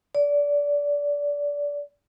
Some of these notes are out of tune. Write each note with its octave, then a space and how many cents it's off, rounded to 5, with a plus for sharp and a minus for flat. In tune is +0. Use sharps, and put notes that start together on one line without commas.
D5 -25